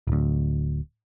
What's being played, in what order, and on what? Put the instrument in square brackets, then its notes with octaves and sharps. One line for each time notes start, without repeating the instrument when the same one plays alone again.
[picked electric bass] D1 D2